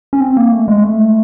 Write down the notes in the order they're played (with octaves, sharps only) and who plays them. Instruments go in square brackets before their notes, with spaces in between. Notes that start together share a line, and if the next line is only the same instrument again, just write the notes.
[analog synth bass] C#4
C4
A#3
A3
G#3
A3